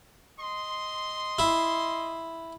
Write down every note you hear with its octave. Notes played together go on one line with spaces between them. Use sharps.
D#5 C6
E4